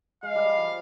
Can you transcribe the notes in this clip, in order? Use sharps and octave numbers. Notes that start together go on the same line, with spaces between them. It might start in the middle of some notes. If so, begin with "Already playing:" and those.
G#3 F5
G3
G3
F3